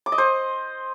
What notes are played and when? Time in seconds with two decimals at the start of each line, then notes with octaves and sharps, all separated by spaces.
0.06 D6
0.12 D#5
0.18 C5